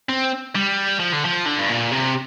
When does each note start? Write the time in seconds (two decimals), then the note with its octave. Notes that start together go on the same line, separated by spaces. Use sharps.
0.09 C4
0.55 G3
1.00 F3
1.13 D3
1.25 F3
1.46 D3
1.58 G2
1.69 A#2
1.91 C3